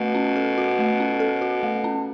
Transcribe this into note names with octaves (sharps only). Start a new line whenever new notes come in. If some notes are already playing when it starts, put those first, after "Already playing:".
Already playing: B2 A3 F#4
C#4
A4
F#4
A3
C#4
A4
F#4
A3
C#4